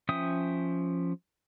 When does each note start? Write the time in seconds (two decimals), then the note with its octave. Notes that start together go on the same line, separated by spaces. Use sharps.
0.09 F3 C#4 E5 G5 D#6